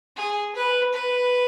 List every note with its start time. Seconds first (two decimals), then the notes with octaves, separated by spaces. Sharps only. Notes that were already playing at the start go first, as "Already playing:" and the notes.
0.16 G#4
0.55 B4
0.93 B4